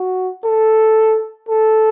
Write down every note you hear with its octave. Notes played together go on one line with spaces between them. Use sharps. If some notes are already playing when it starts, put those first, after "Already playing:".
Already playing: F#4
A4
A4